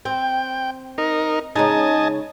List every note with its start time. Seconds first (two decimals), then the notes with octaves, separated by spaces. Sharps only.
0.05 C4 G5
0.98 D#4 A#4
1.56 C#3 G#3 D#4 D#5 G#5 A5